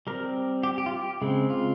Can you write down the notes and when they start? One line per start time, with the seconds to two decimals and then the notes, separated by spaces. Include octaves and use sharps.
0.07 G3 C4 A#4
0.63 G4
0.78 G4
0.86 F4
0.93 G4
1.22 C#3 G#3 C4
1.50 F4